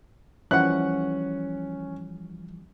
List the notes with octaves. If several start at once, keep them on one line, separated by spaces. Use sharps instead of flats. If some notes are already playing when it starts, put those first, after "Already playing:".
E3 F3 G3 C#4 F#5 F#6